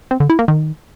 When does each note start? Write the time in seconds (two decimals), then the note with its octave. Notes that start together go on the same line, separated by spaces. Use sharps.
0.11 C4
0.20 D3
0.30 E4
0.39 A#3
0.48 D#3